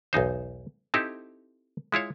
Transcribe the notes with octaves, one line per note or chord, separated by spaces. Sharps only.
B1 E2 D#4 C5
C4 D#4 E4 G4 A4
G#3 E4 F4 C#5